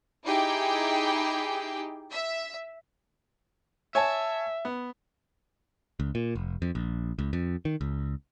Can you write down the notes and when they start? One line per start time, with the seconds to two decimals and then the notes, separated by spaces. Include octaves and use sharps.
0.24 D#4 E4 G4 G#4 G5
2.11 E5
3.95 C#5 E5 G#5 A5
4.65 B3
6.00 C#2
6.15 A#2
6.35 F1
6.62 F2
6.75 A#1
7.19 C#2
7.33 F2
7.65 D#3
7.81 C#2